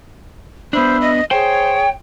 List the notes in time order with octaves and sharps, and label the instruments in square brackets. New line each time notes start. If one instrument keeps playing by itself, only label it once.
[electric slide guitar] B3 D4 [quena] C5 [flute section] E5 B5 E6
[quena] D#5
[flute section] G#4 [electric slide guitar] C5 [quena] C#5 [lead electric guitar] G5